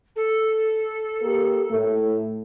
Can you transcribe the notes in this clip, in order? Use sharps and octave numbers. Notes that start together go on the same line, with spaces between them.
A4
A#3 G4 A#4
A2 A3